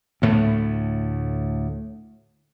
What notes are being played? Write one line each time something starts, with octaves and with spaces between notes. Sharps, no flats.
D2 A2 A3